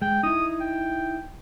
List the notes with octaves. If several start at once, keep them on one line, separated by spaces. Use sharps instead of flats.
G#3 G5
D#4 E4 D#6
G5